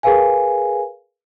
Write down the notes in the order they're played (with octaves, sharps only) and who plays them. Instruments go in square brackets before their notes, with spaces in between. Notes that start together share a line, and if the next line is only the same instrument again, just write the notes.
[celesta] G#4 A#4 B4 F5 G#5